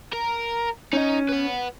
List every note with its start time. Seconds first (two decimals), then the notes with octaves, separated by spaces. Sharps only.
0.13 A#4
0.93 C#4 D#4 D#5
1.29 B4 F#5